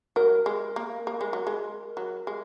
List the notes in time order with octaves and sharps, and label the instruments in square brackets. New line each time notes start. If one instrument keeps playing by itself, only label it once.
[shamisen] F#3 [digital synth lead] A#4
[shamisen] G#3
A#3
A#3
G#3
F#3
G#3
F#3
G#3